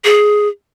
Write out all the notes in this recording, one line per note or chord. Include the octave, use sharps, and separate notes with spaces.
G#4